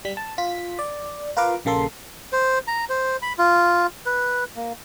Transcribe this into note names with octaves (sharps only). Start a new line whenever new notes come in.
G3 B6
A5
F4 B6
D5
F4 A#4 B4 F5 D6
A#1 C#3 A#3 A4 C6
C5
A#5
C5
B5
F4
B4
A#3